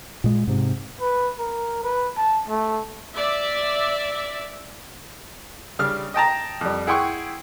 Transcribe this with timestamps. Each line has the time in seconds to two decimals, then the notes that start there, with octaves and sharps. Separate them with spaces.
0.24 A#2 G#3
0.47 G#2 C3
1.01 B4
1.39 A#4
1.84 B4
2.17 A5
2.48 A3
3.12 D5 E5
5.79 C#3 G3 D4 F6
6.14 D#5 G5 A5 A#5
6.61 F2 G3
6.87 E4 G#4 F#5 G5 C6 C#6